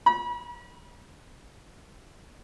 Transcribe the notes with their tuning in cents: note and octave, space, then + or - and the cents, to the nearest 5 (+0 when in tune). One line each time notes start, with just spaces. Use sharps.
B5 -40